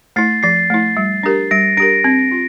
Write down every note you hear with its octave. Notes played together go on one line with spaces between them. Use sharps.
A3 E4 A6 C7
F3 A6 C7
A3 E4
G3
D4 G4 A#4
G3 A#6 D7
D4 G4 A#4 A#6 D7
C4
F4